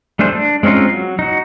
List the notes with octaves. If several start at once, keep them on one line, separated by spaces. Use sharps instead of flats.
G3 A3 D4 G#4 C5
D4
G#3 C4 C#4 D#4 F4
F#3
D#4 F#4